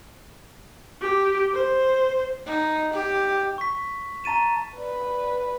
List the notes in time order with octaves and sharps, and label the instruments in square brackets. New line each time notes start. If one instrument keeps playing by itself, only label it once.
[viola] G4
C5
[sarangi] D#4
G4
[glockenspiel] C#6 B6
A5 A#5 A6 D#7 E7
[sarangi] B4 [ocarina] D5